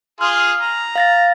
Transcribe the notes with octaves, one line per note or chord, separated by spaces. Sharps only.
F4 G#4 C6 F6
A#5
F5 A6 A#6